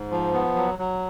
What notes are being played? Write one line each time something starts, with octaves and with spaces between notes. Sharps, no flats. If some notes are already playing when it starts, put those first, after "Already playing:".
Already playing: G#2
F3
B3
F#3
F#3